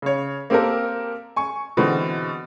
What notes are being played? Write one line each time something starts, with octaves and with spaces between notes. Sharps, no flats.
C#3 C#5
A#3 C4 G4 A4 A#4
G#5 C#6
B2 D3 E3 G#3 C4 F#4